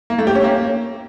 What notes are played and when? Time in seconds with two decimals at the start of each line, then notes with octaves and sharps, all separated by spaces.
0.10 A#3
0.18 A3
0.27 G4
0.35 C#4
0.44 A#3